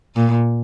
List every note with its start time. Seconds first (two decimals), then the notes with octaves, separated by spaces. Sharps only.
0.16 A#2